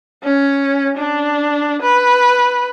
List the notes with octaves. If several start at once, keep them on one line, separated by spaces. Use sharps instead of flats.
C#4
D4
B4